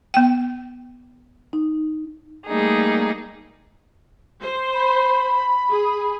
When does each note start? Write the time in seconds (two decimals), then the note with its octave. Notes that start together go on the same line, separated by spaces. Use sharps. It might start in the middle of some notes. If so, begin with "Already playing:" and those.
0.14 B3 G5
1.53 D#4
2.48 G3 A3 A#3 D#4 G#4
4.41 C5
4.73 B5
5.70 G#4